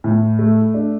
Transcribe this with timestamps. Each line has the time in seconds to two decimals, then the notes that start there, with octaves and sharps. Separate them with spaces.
0.04 A2
0.39 A3
0.74 D4